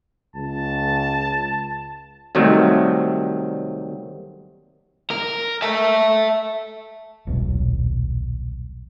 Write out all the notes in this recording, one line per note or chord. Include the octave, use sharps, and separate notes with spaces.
C#2 A5
C2 C3 D#3 F#3 G3 A3
A#4
E5 A5
D#1 B1